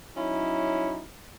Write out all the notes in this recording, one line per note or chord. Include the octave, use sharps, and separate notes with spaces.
F#3 C#4 D#4 E4